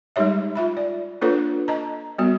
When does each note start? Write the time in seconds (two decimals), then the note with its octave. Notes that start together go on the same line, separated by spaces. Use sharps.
0.16 G3 G#3 D#4 G4 C#5 E5
0.55 F4 E5 B5
0.77 D5
1.21 A#3 D4 F4 A4 B4 C#5
1.68 D#5 A5 A#5
2.18 G3 B3 F#4